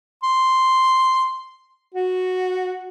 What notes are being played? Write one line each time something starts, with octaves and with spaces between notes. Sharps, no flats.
C6
F#4